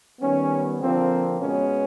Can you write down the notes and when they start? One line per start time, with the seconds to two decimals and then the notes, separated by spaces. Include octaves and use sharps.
0.19 D#3 G3 B3 C#4
0.79 D3 F3 A#3 C4
1.40 B2 G#3 B3 C#4